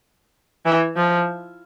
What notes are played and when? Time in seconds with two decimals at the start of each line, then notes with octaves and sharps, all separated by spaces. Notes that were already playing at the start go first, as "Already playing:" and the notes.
0.66 E3
0.96 F3